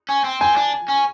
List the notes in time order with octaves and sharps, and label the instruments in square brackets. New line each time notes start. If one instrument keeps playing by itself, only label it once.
[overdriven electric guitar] C#4
C4
[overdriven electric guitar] C4 [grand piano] G#5
[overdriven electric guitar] D4
C#4